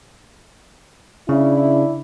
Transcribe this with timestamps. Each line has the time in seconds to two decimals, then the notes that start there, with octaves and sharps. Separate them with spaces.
1.29 C#3 D4 E4